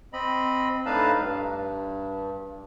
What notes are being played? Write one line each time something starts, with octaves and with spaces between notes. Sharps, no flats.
C4 D#5 B5
A2 D4 D#4 B4 F5 A5
G2